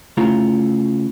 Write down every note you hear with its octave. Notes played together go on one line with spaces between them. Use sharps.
C#3 A3 E4 F4 A#5